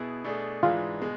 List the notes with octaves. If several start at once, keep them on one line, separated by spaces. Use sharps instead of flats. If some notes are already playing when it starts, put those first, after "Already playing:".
Already playing: B2 B3 E4 G#4
B2 A3 D4 G#4
G#2 E3 G#3 D4 F4
B2 G#3